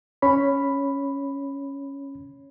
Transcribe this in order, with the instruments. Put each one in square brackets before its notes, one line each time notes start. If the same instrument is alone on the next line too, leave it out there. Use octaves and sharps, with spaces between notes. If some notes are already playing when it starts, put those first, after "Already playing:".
[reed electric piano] C#4 C#5 B5